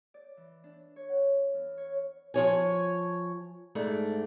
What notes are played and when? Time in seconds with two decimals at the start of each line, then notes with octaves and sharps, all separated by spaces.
0.14 D5
0.37 E3
0.64 D4
0.96 C#5
1.09 F#5
1.54 E2
1.78 C#5
2.34 F3 C#5 G#5
3.75 G#2 A3 D4